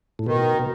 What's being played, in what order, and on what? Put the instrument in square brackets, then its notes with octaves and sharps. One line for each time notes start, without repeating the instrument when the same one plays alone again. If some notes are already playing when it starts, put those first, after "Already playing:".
[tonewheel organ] A2
[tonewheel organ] B2 [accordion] D#3
[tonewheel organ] B2